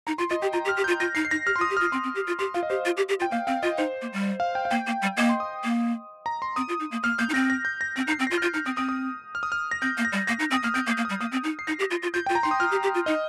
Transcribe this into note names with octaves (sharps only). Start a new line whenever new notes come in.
D#4 A#5
F4 C6
F4 D#5
G4 G5
F4 A#5
G4
F6
G4
G6
F4
F4 A#6
D#4 C7
C7
D#4 A#6
G4 F6
C6
F4
D#6
G4
F6
F4
C4 C6
C4
G4
F4
G4 C6
F4 F5
D#5
G4 C5
F4
G4
G4
F4 G5
A#3 F5
C4 F5
F4 D#5
D#4 C5
A#3
G3
F5
G5
F5
A#3 G5
A#3
G3
A#3 D#5
C6
D#6
A#3
A#5
C6
C4 D#6
F4
D#4
A#3
A#3 F6
A#3 G6
D#4
C4 A#6
A#6
G6
A#6
C4 A#6
D#4
C7
C4
A#6
F4
F6
F4 G6
D#4 F6
C4 D#6
C4 D#6
D#6
F6
D#6
F6
A#6
C4 G6
A#3
A#6
G3
A#3 A#6
D#4
C4
D#6
A#3 F6
C4 G6
A#3
A#3
D#6
G3
A#3 D#6
C4
D#4
C7
D#4 A#6
G4
F4
F4
F4 G6
F4 G5
A#5
D#4 C6
D#6
F4 F6
G4
G4
F4
D#4 D#5